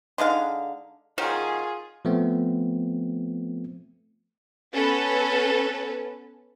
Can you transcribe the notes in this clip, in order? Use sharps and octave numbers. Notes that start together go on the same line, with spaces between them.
D3 G#3 D#4 F5
D#3 F#3 C#4 F4 G#4
F3 A3 B3 C4
B3 C#4 A4 B4